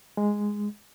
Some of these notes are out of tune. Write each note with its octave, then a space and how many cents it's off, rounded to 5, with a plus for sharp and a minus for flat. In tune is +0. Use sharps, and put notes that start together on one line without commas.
G#3 -5